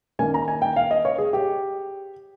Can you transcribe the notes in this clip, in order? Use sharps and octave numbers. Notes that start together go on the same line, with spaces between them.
D#3 A#3 C#4 G#5
A#5
G#5
G5
F5
D#5
C#5
G#4
G4